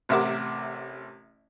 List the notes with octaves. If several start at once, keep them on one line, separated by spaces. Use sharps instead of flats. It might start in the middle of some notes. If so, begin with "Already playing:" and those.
A1 C3 A#4 E5 F#5 D6